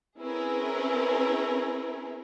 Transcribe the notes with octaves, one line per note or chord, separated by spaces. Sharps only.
C4 C#4 E4 G#4 A#4 B4